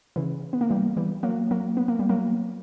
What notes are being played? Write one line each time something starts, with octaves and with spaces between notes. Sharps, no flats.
C#3 E3
B3
A#3
E3 G3
E3 G3
F#3 A#3
F#3 A#3
B3
A#3
G3
F#3 A#3